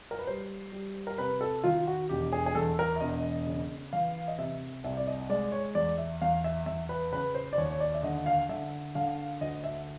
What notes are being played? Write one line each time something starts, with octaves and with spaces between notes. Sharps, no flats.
A#4
B4
G3 C5
G3
A#4
C3 B4
A4
D#3 F4
F#4
E1 G4
G#4
G#4
E2 A4
A#4
E5
E1 D#5
C#3
E3 F5
D#5
C3 E5
C2 E5
D5
D#5
G#3 D5
C#5
E2 D5
E5
E2 F5
E5
E2 E5
B4
C#3 B4
C5
D5
D#2 C#5
C#5
D5
E5
D3 D#5
F5
D3 E5
D3 F5
D2 D#5
E5